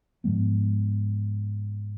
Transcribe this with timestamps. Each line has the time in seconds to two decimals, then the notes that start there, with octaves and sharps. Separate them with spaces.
0.24 G#2 F3 G#3 B3